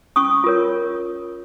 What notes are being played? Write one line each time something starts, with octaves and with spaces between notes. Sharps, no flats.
C#4 C#6 D#6
F4 A#4 C#5